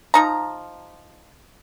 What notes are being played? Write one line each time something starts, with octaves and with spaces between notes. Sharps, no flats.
F3 D#4 A#5